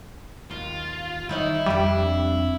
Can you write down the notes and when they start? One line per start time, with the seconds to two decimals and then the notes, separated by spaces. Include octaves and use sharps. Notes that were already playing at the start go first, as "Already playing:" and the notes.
0.51 D#2 F4
1.29 D#3 D#4 E4 C#5
1.66 F2 G3 D4